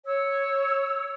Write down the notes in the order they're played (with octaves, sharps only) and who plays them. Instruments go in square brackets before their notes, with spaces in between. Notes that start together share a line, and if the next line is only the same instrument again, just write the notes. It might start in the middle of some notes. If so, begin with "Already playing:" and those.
[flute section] C#5 E6